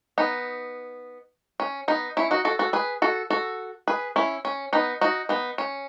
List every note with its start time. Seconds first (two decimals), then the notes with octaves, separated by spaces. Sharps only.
0.18 B3 D#4
1.60 C#4
1.88 B3 D#4
2.17 C#4 E4
2.31 D#4 F#4
2.45 F#4 A4
2.59 F#4 A4
2.73 G#4 B4
3.02 F#4 A4
3.30 F#4 A4
3.88 G#4 B4
4.16 C#4 E4
4.45 C#4
4.73 B3 D#4
5.01 D#4 F#4
5.29 B3 D#4
5.58 C#4